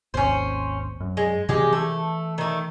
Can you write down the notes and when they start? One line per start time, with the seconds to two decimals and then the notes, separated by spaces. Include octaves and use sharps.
0.14 G#1 D#2 C#4 C5
1.00 F#2
1.17 G#3
1.49 C3 E3 F3 G#3 G4
1.73 E3 A3
2.38 D#3 A3